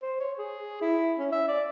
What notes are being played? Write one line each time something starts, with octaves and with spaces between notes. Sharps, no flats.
C5
C#5
G#4
E4
C#4
E5
D5